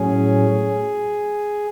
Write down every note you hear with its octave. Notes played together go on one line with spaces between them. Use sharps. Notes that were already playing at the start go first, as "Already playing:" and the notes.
Already playing: A2 F#3 C#4 G#4